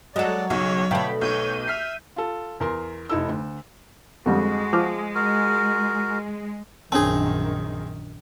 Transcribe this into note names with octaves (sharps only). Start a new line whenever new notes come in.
F#3 G#3 A4 D5 D#5 F#5
B1 C#3 C#5
B2 D3 A3 F5 G5 A5 B5
B1 C#5 G6 D#7
E5 F6 B6 C7
F4 A4
E2 A#4 C6
F1 D#4 E4 A4 E6
D2
F2 D3 G3 G#3 F#4
F3 D6 F6
F#4 A#4
A#1 F#2 D#3 C4 D4 G#4 C#5 A5